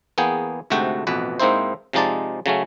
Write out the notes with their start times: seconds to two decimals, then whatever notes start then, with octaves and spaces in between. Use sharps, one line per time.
0.18 E2 A#3 B3 G#4 G5
0.70 D2 G#2 C3 A3 F#4 G5
1.07 A1 F2 B2 B4
1.40 G#2 A#3 C4 D#4 E4 C5
1.93 C3 F3 G#3 D#4 D5 A5
2.46 C#3 F#3 A3 C#4